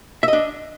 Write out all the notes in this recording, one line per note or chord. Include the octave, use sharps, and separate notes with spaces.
D4 D#5 E5